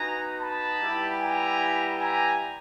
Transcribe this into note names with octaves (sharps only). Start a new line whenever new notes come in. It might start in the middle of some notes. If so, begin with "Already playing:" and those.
Already playing: B3 D#4 F#4 G#5 A#5
A5 B5
G3 B3 E4 G4
G#5 A#5
G#5 A#5